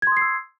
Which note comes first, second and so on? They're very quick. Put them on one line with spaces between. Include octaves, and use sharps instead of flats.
G#6 C6 D#6 C7 E6